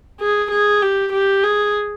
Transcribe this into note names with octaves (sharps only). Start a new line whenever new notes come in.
G#4
G#4
G4
G4
G#4